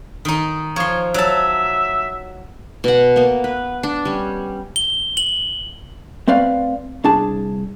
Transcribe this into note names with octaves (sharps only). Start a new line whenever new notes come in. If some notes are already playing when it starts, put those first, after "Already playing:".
D#3 D#4
F3 C#5 C6
F#3 E5 A5
B2 F#5
A#3 B3
B4
D4
G3 C#4
G7
F#7
A3 C4 B4 D5 F5
C2 D4 G#4 A5